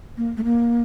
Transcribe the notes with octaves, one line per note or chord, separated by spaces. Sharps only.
A#3
A3
A#3